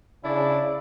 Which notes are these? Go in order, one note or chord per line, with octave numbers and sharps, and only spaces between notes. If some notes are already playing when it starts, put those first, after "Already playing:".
C#3 D4 E4 D5